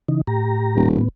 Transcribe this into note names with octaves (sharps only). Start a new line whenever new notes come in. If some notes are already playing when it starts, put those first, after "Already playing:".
C#3 E3 D#4
A2 G4 A#5
D#1
A2 B3